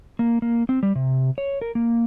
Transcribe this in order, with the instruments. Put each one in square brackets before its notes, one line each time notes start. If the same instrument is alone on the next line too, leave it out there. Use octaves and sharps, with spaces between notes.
[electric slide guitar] A#3
A#3
C4
G3
C3
C#5
A#4
A#3